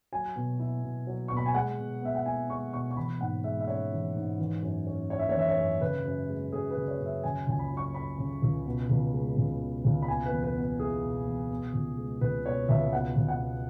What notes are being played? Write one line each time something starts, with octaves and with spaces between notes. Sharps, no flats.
F#3 G#5
B2
E4
B2
F#3
B2 C#6
B5
G#5
G#3 F#5
B2
B3 E5
F#5
E4 G#5
G#3 C#6
B2 C#6
C#6
E3 B5
G#2 F#5
G#3 E5
E5
C#4 C#5
E3
G#2
E3
F#2
C#4
E4 C#5
E5
C#5
E3 E5
C#5
F#2
C#3 B4
F#2
G#3
F#2 G#4
B4
C#3
C#5
F#2
E5
C#3 G#5
C#2 G#5
B5
F#3
C#6
C#4 B5
C#3
C#2
B2
C#2
G#3
C#2
B2
C#2
B5
B2 G#5
B4
E2
B4
B3
B4
E4 G#4
B2
E2
B2
C#2
G#3
C#2 B4
B2 C#5
C#2 E5
B2 F#5
C#2
F#5
B3